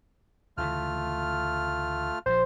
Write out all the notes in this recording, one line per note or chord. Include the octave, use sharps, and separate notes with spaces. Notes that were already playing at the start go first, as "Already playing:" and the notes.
D2 C#3 E3 A3 F4 F6
A#1 D3 F3 C5